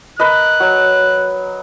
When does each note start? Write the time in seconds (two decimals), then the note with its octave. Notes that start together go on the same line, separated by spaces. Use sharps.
0.19 A#4 B4 D#5 F#6
0.60 F#3